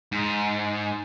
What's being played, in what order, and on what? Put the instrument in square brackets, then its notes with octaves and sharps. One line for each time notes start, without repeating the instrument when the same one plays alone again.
[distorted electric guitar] G#2